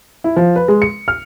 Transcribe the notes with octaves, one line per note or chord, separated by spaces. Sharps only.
E4
F3
B4
G#3
C#7
F6